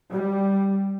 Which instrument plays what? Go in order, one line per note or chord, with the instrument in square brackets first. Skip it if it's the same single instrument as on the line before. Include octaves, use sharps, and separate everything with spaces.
[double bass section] G3